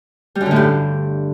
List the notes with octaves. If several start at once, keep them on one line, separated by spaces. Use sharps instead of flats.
G3
F#2
D3
A2
G2